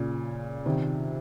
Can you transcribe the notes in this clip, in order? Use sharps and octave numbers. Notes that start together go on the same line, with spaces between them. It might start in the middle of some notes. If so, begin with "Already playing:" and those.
Already playing: A#2 C#3
C3 D#3